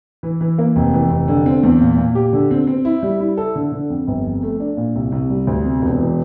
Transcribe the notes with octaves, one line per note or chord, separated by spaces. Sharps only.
E3
E3
A#3
F1
E3
F1
D3
C4
E2
A#2
A#2
G4
D3
C4
C4
E4
G3
E4
A4
D3
D3
F2
G1
F2
A3
D4
A#2
C2
C2
G3
D2
C3
E1
E3